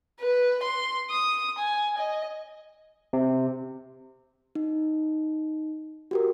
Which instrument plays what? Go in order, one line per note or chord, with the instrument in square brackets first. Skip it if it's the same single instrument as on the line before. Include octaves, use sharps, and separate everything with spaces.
[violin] B4
C6
D#6
G#5
D#5
[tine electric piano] C3
[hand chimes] D#4
F#4 G4 A#4